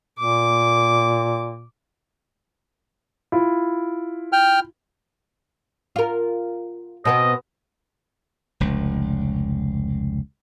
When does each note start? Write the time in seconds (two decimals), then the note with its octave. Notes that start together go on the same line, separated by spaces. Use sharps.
0.19 A#2 D6
3.32 E4 F4
4.32 G5 F6
5.96 F4 A#4
7.05 B2 B3 C4 D#5
8.60 F1 C#2